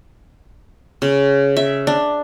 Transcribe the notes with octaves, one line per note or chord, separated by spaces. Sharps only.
C#3
E5
D4